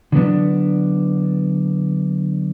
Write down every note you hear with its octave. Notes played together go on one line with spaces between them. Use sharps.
D3 F#3 B3 D4